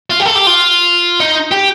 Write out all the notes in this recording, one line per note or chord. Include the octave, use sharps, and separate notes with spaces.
F4
G4
A4
G4
F4
D#4
G4